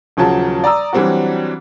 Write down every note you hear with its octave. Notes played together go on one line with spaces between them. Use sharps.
D#1 C#3 F3 F#3 A5
D5 A#5 D#6 E6
E3 F#3 G3 C4 D4 F#4